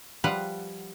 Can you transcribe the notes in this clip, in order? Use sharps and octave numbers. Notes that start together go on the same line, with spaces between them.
F3 G3 B4 F5 F#5